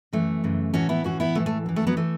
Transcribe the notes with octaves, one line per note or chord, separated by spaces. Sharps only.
F#2 E3 A3
F#2 C#3 E3
A2 E3 C#4 F#4
B3 E4
A2 E3 C#4 F#4
B3 E4
A2 E3 A3
A3
F#2 E3
A3
F#3 B3
E3 A3